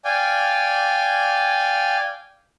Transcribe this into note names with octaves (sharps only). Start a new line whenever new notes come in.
D5 F5 G5 G#5